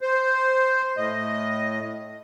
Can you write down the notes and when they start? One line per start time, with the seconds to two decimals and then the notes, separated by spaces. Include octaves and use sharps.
0.01 C5
0.97 A2 D#5